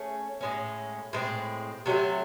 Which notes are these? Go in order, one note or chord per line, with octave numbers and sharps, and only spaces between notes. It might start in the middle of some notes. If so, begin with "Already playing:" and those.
Already playing: A3 C#4 G#4
A2 G#3 C#4
A2 G#3 C4
C3 F#3 A3